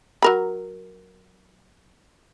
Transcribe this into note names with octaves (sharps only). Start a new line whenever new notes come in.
F#3 A#4 B5